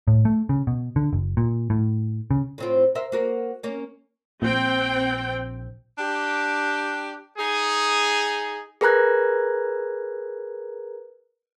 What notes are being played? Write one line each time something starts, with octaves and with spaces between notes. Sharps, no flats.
A2
A3
C#3
B2
D3
F#1
A#2
A2
C#3
A2 C4 F4
A#4 C5 E5
A#3 F#4 A#4
A#3 C#4
A#1 C4 G5
D4 G4
D#4 G#4
G#4 A#4 B4 A#5 F#6 G#6